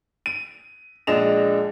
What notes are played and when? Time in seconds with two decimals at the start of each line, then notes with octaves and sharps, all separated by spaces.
0.26 D#7
1.07 A#1 G#3 D4 D#5 E7 F7